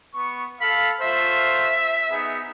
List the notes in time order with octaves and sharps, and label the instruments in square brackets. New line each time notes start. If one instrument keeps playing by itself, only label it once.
[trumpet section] B3 C#6
[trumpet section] A4 F5 [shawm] B5
[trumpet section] A3 F4 C5 [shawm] E5
[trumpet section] B3 D#4 G#4